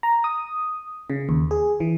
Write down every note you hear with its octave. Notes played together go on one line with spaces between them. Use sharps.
A#5
D#6
C#3
D#2
G#4
E3